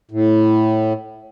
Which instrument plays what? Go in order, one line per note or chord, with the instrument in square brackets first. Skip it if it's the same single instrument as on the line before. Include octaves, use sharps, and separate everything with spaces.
[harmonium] A2